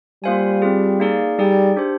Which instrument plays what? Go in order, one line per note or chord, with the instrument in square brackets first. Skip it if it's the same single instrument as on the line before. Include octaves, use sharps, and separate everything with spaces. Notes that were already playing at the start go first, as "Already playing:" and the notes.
[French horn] G3 [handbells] A#3 F4 C5 F5 G#5
[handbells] C4 F4 G#4
A#3 D#4 G#4 D5 F5
[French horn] G3 [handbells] D#4 G#4 D5 G5
[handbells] D4 G4 C5